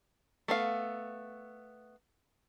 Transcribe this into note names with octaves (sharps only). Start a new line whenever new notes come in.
A3 B3 F5